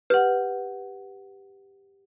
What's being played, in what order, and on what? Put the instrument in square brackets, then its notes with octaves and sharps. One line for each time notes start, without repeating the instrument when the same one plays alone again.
[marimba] G4 F#5 [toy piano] B4